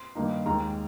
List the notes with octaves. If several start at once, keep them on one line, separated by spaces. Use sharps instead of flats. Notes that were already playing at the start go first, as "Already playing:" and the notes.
Already playing: C6
G2 D#3 A#3 D#4
D#2 D#3 G#3 A#5